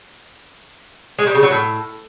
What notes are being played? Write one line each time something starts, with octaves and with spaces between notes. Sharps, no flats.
G#3
G3
C#3
F#3
A2